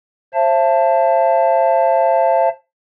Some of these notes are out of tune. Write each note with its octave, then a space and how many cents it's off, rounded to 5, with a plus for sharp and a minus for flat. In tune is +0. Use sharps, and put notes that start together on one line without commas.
C5 +30 E5 +40 A5 +0